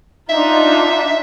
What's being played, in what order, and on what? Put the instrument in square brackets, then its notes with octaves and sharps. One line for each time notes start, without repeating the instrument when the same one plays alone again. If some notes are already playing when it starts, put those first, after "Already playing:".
[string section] D4 D#4 F4 [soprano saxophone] E5